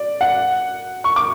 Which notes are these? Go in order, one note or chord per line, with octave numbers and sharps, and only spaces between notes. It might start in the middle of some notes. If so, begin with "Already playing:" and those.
Already playing: D5
F#5
C#6
D6